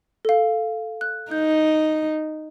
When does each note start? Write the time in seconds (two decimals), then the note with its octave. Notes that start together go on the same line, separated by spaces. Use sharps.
0.25 A4 F5
1.01 F#6
1.31 D#4 G6